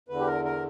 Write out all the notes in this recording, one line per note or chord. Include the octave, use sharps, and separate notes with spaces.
E2 D3 B4
G4
A#4
A#4